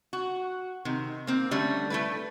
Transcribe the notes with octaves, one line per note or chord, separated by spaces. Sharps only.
F#4
C3 D#3
A#3 C4
D3 G3 A3 C#4
A3 E4 B4